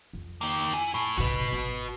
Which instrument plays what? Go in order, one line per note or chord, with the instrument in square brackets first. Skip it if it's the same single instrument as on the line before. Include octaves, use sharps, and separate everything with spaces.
[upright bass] F2
[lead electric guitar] D#3 A#3
E4 G#5
A2
[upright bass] F1 G#2 [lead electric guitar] F#4 B4
[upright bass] G#1